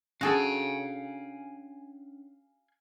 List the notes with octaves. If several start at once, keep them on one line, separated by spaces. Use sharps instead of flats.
C#4 D4 F#4 G#4 A4 F5 G#5